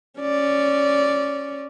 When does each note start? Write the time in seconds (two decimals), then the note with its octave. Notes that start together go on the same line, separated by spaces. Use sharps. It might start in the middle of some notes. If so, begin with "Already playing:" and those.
0.20 C#4 D5